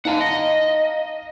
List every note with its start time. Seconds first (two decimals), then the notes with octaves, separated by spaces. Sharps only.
0.05 D#4 F5 F#5 A5 A#5
0.21 D#5